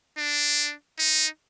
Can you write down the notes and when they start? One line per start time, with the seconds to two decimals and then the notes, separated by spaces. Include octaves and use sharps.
0.18 D4
0.99 D#4